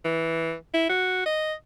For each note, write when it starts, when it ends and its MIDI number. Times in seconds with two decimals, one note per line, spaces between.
0.05 0.54 52
0.74 0.85 64
0.89 1.25 66
1.26 1.53 75